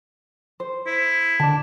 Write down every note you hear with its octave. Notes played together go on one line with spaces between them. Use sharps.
C5
E4
D3 D4 A5